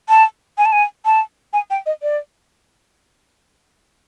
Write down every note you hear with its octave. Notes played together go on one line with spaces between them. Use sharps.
A5
G#5
A5
G#5
A5
G#5
G5
D#5
D5